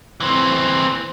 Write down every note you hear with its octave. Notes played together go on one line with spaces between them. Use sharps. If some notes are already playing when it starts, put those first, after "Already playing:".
E3 C4